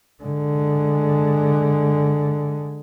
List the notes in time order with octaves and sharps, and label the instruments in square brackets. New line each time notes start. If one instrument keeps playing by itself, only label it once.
[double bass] D3 G#3